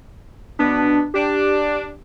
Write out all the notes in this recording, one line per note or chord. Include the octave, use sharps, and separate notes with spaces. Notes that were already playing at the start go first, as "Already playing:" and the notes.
B2 B3 D4
D4 G4